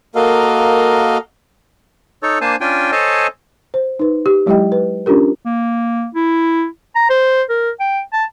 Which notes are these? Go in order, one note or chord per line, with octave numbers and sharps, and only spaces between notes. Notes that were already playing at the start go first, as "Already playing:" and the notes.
A#3 F#4 A4 A#4 D#5 F5
D#4 A4 C#5
A#3 D4 C5 G#5 A5
C#4 D4 F4 G5 G#5
A4 C5 C#5 D#5 G#5 A5
C5
D#4 B4
G4
F#3 G#3 E4 G4 D#5 G5
B4
C#4 D4 F4 G4 A#4
A#3
E4
A#5
C5
A#4
G5
A5